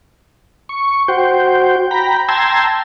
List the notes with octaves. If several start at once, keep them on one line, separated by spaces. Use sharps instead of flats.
C#6
F#4 C5 G5
G5 A#5 B5
G5 A5 A#5 C6 E6 G#6